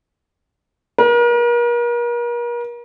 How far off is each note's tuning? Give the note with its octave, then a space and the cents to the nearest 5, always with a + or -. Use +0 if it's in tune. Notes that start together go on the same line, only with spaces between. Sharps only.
A#4 +40